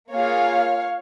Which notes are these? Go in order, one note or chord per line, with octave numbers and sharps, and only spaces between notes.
A#3 F4 G#4 C#5 F5